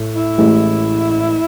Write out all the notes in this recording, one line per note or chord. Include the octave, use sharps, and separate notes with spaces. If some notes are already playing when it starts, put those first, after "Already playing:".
Already playing: A2
E4
A1 A2 G#3